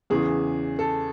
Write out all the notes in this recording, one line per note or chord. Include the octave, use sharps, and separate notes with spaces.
E2 C#3 E3 G#4
A4